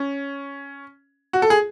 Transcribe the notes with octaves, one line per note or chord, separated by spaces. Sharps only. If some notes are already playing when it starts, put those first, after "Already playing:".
Already playing: C#4
F#4
A4
G#4